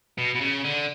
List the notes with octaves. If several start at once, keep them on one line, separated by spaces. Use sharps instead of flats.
B2
B2
C#3
D3